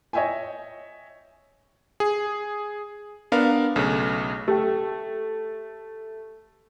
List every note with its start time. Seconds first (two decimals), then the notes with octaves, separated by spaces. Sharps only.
0.13 C#5 D#5 E5 G5 G#5
2.00 G#4
3.32 B3 D4 A#4 F5
3.76 B1 C#3 A3
4.48 A3 G4 G5